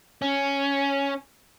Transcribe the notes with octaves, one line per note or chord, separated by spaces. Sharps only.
C#4